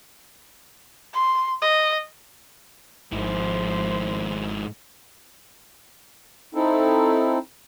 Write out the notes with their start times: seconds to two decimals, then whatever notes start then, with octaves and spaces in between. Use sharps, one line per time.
1.13 C6
1.62 D#5
3.12 G#1 G#2 F3 E4 C5
6.55 C4 D#4 E4 A4